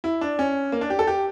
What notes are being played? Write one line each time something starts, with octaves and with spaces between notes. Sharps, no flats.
E4
D4
C#4
A#3
D4
G4
A4
G4